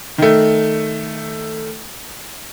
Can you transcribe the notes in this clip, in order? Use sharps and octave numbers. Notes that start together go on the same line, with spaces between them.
D#3 A3